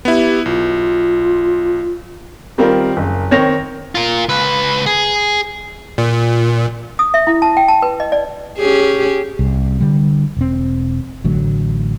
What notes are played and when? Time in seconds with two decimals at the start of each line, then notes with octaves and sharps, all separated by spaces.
0.05 B3 E4 G4
0.46 B1 F4
2.58 D#3 G3 C4 F4 A#4
2.97 F#1
3.31 D#3 C4 C#5 A#6 F7
3.95 F4 A#4
4.29 C#2 B4
4.86 G#4
5.98 A#2
6.99 D#6
7.14 E5
7.27 E4
7.42 A5
7.57 G5
7.68 A5
7.82 B4
8.00 D#5
8.12 D5
8.59 C#4 G4 G#4
9.39 C2
9.81 D3 G3
10.37 E1 C4
11.24 A1 D3 F#3 A3